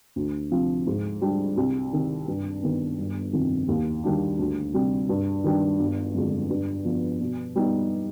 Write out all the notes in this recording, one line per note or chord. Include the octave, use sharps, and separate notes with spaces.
D2
C3 F3
G#2
G3 D4
C2
C3 D#3
G2
D#3 B3
G1
F2 C3 D#3
D#2
D#3 G3 D4
D2
C3 G3
G2
D#3 G3 D4
G1
F2 D3 G#3
G2
F3 B3
B2
G3 B3 D#4